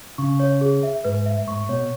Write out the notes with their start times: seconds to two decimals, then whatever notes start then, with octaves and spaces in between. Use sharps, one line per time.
0.18 C#3 C#6
0.40 C#5
0.61 G#4
0.83 E5
1.04 G#2 B4
1.26 E5
1.47 G#2 C#6
1.69 B2 C#5